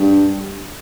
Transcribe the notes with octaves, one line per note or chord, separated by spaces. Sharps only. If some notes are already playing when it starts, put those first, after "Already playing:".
Already playing: G2